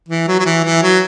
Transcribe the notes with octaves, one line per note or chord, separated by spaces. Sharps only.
E3
F#3
F#3
E3
E3
F#3